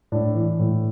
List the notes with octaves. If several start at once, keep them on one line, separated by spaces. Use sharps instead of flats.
A2 D4
E3
A2